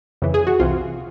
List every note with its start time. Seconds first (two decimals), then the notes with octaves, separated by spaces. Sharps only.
0.22 F2 C#3 E3
0.34 G#4
0.47 F#4
0.60 C2 C3 E3 F4